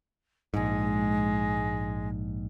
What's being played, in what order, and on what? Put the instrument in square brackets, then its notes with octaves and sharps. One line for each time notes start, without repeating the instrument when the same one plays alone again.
[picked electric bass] A#1 G#2 [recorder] G#3